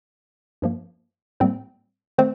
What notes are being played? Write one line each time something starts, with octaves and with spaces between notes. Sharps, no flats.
G2 F3 A#3
A2 G3 A#3 C4 C5
D#3 A3 C4 C5